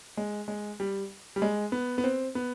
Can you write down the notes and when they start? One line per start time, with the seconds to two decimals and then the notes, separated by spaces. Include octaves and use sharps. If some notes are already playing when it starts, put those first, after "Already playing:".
0.17 G#3
0.48 G#3
0.80 G3
1.36 G3
1.42 G#3
1.72 B3
1.98 B3
2.04 C4
2.35 B3